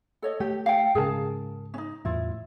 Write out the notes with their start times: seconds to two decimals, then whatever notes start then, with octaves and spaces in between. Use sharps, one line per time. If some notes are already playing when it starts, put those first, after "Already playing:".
0.22 A4 C#5 D#5
0.40 A3 G4
0.66 F5 G5
0.95 G#2 C#3 G#4 A#4 A5
1.74 C#4 D#4
2.05 E2 A2 E4 F4